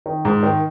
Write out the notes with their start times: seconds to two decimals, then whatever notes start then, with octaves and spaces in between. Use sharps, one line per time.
0.06 D#3
0.25 G#2
0.43 D#3